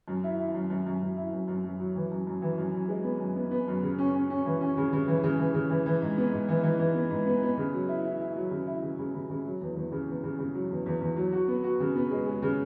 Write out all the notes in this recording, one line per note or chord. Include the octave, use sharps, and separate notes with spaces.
F#2
E4
E4
F#2
F#2
F#2
F#2
E4
F#2
F#2
F#2
F#3
E3
F#2
F#2
E3
F#2
F#2
G#3
B3
F#2
B3
B3
F#2
C#3
C#4
C#4
C#4
E3
C#4
C#3
C#3
E3
C#3
E3
C#3
E3
E3
G#2
B3
G#2
E3
E3
E3
B3
G#2
B3
B3
C#3
F#3
E4
E4
E4
F#3
C#3
E4
C#3
C#3
C#3
C#3
F#3
E2
E2
C#3
E2
C#3
C#3
F#3
E2
E2
E2
F#3
F#4
B3
F#4
C#3
B3
G#3
G#3
C#3